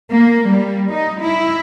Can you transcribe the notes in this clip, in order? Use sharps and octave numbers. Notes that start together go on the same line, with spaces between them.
A#3
G3
D#4
E4